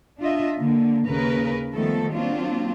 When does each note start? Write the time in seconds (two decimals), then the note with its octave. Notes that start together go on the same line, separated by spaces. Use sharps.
0.19 D4 F4 D#5 E5
0.57 D3 A#3
1.07 D#2 C#3 A#4 B4
1.74 D#3 F3 G3 A3 B3 A4
2.11 F#3 A#3 C4 D4 F4